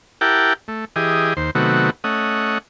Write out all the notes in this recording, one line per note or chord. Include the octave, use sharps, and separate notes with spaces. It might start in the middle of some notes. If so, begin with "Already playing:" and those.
E4 G4 A#4 F#5 G5 A5
A3
E3 G4 G#4 D#5
D#2 C5
C3 D#3 F#3 A3 B3 F#4
A3 C#4 D#5 F#5